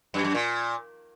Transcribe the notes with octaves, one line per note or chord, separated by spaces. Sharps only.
F#2
F#2
A#2